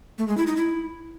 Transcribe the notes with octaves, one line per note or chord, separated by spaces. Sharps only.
A3
G#3
E4
D#4
E4